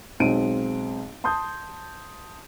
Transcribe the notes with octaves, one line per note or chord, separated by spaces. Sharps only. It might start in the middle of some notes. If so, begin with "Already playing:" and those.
B1 G#3 C4 D7 D#7
A5 C6 D#6 G6